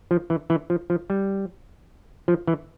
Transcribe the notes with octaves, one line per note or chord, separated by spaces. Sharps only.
F3
E3
E3
F3
F3
G3
F3
E3